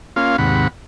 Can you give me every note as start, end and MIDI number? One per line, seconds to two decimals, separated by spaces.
0.16 0.36 58
0.16 0.36 61
0.16 0.36 65
0.16 0.36 77
0.38 0.67 39
0.38 0.67 44
0.38 0.67 48
0.38 0.67 78
0.38 0.67 83